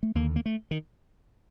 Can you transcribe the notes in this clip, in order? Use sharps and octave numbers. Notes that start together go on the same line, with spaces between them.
A3
D#2 D3 A#3
A#3
A3
D#3